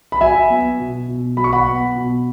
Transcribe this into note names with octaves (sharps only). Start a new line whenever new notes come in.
B5
F#3 E5 G#5
B3
B2
B2
F#3 B5
C#6
F#5 B5
B3
B2